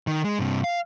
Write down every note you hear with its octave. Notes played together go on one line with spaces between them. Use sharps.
D#3
G#3
G2 C3
F5